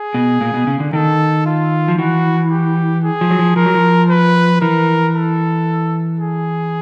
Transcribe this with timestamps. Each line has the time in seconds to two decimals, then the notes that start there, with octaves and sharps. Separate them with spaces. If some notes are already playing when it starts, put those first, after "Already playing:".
Already playing: G#4
0.14 B2
0.41 A#2
0.54 B2
0.67 C#3
0.80 D3
0.93 D#3 A4
1.46 F4
1.88 F3
1.99 E3 F#4
2.51 G4
3.04 G#4
3.21 F3
3.31 F#3
3.39 F3
3.56 F3 A#4
3.66 F#3
3.75 F3
4.09 B4
4.61 E3 A#4
5.15 A4
6.20 G#4